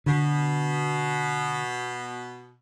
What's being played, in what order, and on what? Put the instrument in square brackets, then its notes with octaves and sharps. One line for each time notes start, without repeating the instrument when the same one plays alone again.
[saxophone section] B2 [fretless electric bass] D3